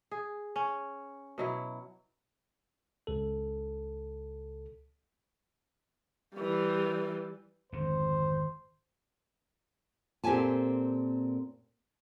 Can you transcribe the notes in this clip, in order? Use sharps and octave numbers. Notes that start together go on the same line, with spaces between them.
G#4
C#4
B2 F#3 E4
C#2 A4
E3 G3
G#1 F2 D3 C5
A#2 C4 G4 A4 G#5 A5